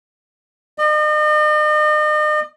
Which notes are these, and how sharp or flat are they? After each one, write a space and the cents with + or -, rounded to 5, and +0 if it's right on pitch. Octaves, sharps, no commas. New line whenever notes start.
D#5 -40